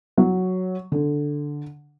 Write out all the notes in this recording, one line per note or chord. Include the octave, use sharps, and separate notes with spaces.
F#3
D3